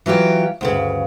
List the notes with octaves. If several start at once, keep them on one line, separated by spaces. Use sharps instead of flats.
E3 F#3 F4 G4
D2 G2 C#3